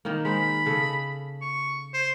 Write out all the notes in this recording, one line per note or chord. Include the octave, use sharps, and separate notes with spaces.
D#3 A#3
G#3 C5 B5
C#3 A4 D#5
C#6
C5